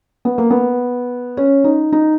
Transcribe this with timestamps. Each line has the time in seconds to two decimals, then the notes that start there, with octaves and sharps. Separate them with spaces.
0.25 B3
0.38 A#3
0.50 B3
1.37 C#4
1.64 D#4
1.92 D#4